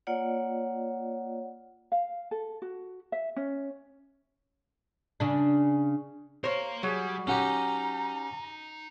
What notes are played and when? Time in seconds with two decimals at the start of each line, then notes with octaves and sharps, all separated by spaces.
0.07 A#3 F4 C#5 D5 F#5
1.92 F5
2.31 A4
2.62 F#4
3.12 E5
3.36 C#4
5.20 C#3 D4
6.44 A#4 C5 C#5 F5
6.83 F#3 G3 G#4
7.27 C#4 D#4 F#4 G4 A#5